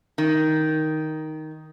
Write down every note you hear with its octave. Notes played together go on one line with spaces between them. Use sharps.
D#3